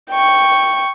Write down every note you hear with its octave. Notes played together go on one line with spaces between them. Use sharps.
G5 C#6